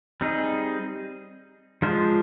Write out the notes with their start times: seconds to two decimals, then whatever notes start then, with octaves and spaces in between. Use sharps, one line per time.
0.21 G3 C4 D#4 G#4
1.82 F3 G#3 D4 F4 C5